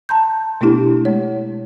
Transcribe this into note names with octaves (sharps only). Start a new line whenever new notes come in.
A5 A#5 C6 G6
B2 A3 B3 D4 E4 G4
G#3 C#5